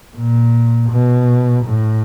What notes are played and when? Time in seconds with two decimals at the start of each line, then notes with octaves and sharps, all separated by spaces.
0.17 A#2
0.90 B2
1.64 A2